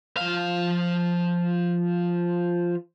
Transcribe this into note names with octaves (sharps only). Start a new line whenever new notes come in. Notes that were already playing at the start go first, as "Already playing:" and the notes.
F3 F5